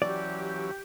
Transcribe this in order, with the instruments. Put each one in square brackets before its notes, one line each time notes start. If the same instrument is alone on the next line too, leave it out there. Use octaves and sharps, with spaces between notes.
[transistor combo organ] E3 F#3 C#4 [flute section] G4 [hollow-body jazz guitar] D5